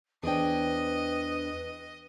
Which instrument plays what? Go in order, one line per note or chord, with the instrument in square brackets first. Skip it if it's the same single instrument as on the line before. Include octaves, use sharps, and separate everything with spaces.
[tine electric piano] E2 D4 [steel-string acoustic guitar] G#4 C5 G5 [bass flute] B4 [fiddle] D#5